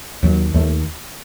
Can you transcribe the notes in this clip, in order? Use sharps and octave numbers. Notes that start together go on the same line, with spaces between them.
D#2 F#3
D#2 A3